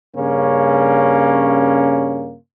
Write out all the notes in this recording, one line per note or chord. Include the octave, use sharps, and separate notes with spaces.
G2 C#3 A#3 C#4